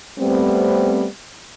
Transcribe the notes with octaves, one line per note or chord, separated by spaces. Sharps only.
G3 A3 B3 C4